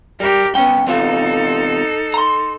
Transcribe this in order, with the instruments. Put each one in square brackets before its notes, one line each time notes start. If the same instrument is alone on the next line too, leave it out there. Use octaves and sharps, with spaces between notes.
[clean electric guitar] G3 [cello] G4 A#4
[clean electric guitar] C2 G5 [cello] B3 C#4
[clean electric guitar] E2 C3 F4 [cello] D#4 A4
[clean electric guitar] A#5 C6